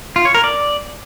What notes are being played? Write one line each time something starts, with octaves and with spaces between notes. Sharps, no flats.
F4
C#5
A#4
D5